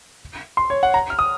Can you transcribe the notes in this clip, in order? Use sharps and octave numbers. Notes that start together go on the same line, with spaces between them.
C6
C#5
F#5
A#5
F6
D#6